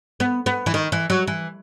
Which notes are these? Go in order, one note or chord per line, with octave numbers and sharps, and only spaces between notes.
B3
B3
E3
D#3
E3
F#3
E3